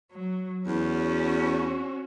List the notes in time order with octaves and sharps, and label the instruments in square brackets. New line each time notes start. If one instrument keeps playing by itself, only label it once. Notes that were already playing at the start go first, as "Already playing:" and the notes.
[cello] F#3
[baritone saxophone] E2 [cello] C#4 F#4